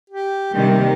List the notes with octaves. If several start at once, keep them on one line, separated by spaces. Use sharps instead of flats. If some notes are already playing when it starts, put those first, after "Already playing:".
G4
C3 D#3 G3 A#3 G4